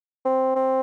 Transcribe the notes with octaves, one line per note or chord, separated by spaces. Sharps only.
C4
C4